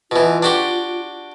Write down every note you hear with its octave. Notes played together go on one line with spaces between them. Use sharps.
B2 E3 F4
D4 F#4 G4